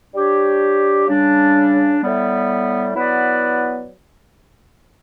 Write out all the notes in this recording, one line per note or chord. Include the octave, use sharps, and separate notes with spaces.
G3 D4 G4 C#5
C#3 G3 D4
A2 G3 B3
F#3 B3 E4 B4 D5